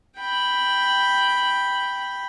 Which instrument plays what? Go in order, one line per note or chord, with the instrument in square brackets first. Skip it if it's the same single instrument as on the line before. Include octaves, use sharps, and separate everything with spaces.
[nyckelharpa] G5 B5